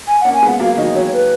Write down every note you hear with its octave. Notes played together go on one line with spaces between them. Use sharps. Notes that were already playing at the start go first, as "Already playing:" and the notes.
G#5
F#5
A#3 C#4
G#5
G#3 B3
F#5
F#3 A#3 F5
D#3 F#3 D#5
D#3 F#3 C#5
B4